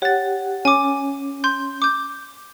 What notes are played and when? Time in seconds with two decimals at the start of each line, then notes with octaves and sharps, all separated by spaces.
0.02 G4 C#5 F#5 A6
0.65 C#4 G#5 D6
1.44 C6 G6
1.82 D6 G6